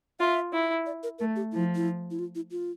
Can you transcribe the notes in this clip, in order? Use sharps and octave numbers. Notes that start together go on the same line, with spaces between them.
F4 E5
E4
D5
A#4
A3 A#4
G4
F3 E4
E4
E4
F4
E4
F4